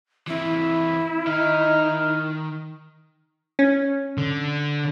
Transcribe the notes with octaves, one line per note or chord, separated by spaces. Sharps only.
E3 C4 E4
D#3 D#4 F6
C#4
D3